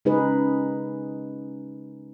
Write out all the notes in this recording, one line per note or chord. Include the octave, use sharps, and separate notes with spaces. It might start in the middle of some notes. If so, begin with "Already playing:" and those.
C#3 G#3 D#4 G#4 B4